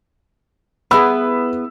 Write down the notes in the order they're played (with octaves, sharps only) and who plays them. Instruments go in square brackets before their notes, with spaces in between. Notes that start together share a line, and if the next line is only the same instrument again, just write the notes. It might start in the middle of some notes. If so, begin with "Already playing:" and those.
[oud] B3 E4 G#4 [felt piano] B5 E6